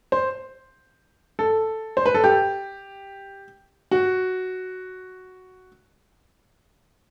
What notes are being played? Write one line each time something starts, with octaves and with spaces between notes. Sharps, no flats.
C5
A4
C5
B4
A4
G4
F#4